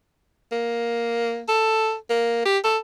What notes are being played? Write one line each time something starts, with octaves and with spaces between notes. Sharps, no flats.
A#3
A4
A#3
G4
A4